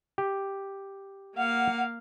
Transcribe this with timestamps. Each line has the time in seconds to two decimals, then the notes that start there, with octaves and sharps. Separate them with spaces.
0.18 G4
1.36 A#3 F5 F#5